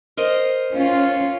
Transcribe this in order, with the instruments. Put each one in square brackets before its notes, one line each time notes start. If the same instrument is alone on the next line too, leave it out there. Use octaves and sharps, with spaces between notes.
[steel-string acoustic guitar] A#4 C5 D#5
[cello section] C#4 F4